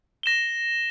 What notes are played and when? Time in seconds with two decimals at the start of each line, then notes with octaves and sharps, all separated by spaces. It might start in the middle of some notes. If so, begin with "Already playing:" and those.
0.23 A#6 E7 G7